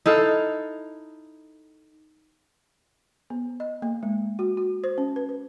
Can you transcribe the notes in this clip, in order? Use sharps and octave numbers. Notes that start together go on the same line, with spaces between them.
D#4 E4 A4 F5
B3
D#5
A#3
G#3
F#4
F#4
C5
C#4
B4
B4